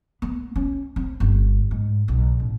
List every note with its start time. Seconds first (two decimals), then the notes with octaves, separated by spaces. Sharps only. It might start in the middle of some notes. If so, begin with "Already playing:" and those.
0.22 B3
0.56 C#4
0.96 C4
1.20 G1
1.71 G#2
2.08 B1
2.40 A1